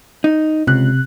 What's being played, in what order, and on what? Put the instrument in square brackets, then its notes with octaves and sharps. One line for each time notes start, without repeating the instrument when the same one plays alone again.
[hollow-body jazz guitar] D#4
[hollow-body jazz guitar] C#2 [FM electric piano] C3 F#6